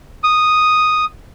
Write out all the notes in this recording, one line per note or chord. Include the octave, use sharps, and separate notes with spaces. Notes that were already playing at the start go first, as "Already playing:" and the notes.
D#6